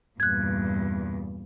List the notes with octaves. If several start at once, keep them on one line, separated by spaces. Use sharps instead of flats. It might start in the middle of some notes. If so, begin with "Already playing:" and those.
E2 G2 A#2 F#6 G#6